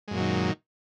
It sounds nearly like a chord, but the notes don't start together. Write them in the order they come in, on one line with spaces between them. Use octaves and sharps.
G#3 F#2 A#2 F#3 D#3